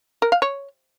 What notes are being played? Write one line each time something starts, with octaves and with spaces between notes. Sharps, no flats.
A#4
F5
C#5